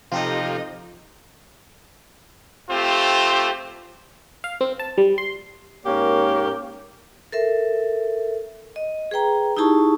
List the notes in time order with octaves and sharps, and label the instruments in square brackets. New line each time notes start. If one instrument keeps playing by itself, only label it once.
[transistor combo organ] C3 F3 [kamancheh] D#4 D#5 [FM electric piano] F4 G4 A4
[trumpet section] A3 C4 F4 G4 C5
[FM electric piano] F5
C4
A5
G3
C6
[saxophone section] G#2 A#3 C#4 G4 A#4 C#5
[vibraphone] A4 A#4 E5
D#5
G#4 B4 G5 A#5
D#4 E4 G4 G#4 A5 C#6